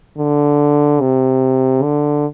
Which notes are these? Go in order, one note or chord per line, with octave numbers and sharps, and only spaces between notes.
D3
C3
D3